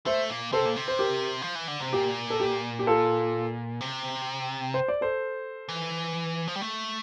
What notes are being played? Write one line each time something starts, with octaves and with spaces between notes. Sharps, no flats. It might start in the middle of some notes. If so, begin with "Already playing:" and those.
A3 C5 E5
A#2
C3 A4 C5
A#2
C3
C5
G4 A#4
F3
E3
D3
C3
A#2 G4
A4
G4
G4
F4 A4
C3
C5
D5
A4 C5
E3
F3
G3
A3